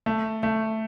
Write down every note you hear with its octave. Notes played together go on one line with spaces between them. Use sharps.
A3
A3